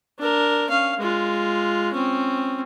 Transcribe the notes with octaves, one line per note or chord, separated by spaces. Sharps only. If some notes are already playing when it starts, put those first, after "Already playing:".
D4 A#4
C#4 F5
G#3 F4
C4 C#4